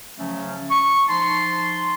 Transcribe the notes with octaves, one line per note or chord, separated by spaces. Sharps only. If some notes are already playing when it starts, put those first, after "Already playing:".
C#3 F3 F#3 A3 C#4
C#6
F3 D#4 A5 C6